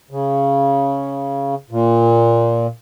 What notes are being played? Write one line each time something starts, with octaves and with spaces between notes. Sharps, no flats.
C#3
A#2